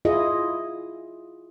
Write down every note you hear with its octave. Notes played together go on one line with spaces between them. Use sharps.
E4 F4 G#4 D#5